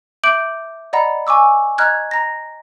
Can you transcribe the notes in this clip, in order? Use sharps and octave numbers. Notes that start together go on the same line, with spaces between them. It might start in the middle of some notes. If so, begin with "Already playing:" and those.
E5 D6 G6 D7 F#7
D5 D#5 F#5 A#5 B5
G#5 C#6 D6 E6
D#5 A#5 F6 F#6 G#6
A#5 A#6